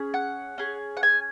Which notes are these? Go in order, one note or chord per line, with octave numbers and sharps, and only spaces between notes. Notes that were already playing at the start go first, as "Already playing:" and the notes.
Already playing: C#4 G#4
F#5
C#4 G#4
F#5
G#5